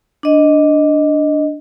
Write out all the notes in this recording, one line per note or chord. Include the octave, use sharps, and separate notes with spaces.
D4 D#5